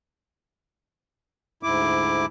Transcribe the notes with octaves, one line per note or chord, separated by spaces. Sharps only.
D2 G#2 E4 D6